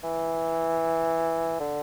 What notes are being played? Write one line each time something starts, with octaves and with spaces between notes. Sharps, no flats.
E3
D3